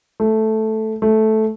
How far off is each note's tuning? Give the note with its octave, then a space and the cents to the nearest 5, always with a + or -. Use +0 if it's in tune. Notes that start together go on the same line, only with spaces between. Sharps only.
A3 -5
A3 -10